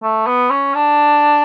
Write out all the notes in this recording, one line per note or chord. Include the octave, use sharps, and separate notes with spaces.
A3
B3
C#4
D4